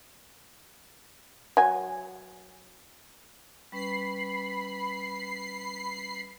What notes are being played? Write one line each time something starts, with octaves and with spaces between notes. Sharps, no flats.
F#3 G#5
G3 C#4 B4 B5 C7